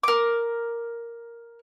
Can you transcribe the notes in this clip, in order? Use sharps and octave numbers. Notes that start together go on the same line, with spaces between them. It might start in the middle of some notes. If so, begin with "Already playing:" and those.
A#4 D6